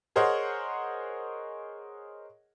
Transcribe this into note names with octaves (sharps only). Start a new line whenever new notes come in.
G#4 A#4 C5 C#5 D#5 F#5